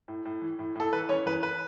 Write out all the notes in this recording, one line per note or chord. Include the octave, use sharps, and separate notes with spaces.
A2
A2
E3
A2
A2 A4
E3 B4
E3 C#4 C#5
E2 B4
B4